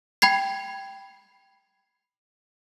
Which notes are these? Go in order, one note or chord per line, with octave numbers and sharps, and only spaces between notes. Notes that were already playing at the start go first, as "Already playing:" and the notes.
G5 B5 G#6 C7